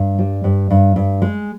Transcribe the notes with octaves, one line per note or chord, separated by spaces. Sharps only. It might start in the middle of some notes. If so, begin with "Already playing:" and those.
Already playing: G2
G3
G2
G2
G2
G#3